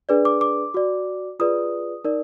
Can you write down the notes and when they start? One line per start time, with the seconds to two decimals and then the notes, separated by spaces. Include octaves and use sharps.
0.09 D4 G#4 B4 D5
0.25 D6
0.41 D6
0.74 F#4 D5
1.39 F4 G#4 B4 D5 D#6
2.05 D#4 A#4 D5